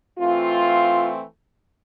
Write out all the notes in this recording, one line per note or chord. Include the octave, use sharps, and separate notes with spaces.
E3 A3 C4 F4